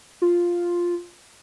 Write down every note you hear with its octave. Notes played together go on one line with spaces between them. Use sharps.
F4